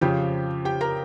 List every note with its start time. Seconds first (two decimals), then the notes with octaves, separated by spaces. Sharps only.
0.01 F2 C#3 F3 G4 G5
0.65 G4 G5
0.81 A#4 A#5